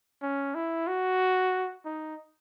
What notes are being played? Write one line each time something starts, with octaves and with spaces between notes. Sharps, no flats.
C#4
E4
F#4
D#4